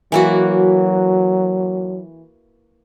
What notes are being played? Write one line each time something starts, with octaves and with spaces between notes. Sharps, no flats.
E3 F#3 A#3 F#4